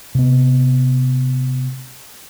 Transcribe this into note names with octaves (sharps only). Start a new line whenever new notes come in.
C3 B3